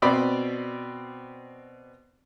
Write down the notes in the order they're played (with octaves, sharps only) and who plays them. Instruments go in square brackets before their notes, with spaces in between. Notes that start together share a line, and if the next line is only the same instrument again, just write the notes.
[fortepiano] B2 C4 D5 B5